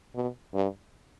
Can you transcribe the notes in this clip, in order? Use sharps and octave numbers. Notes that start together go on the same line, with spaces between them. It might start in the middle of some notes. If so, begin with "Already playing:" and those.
B2
G2